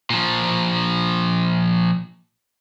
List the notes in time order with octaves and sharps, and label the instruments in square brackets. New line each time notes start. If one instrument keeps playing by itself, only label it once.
[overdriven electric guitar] A#2 F3